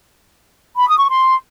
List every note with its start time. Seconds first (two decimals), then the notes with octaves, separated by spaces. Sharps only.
0.77 B5
0.88 D#6
0.98 C#6
1.08 C6